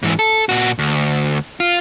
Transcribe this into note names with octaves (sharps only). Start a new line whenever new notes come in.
G#2 E3
A4
A#2 F#4
D2
F4